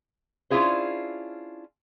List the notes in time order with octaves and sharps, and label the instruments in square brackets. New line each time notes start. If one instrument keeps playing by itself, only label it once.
[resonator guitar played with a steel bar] C#4 D4 E4 F4 G#4 C5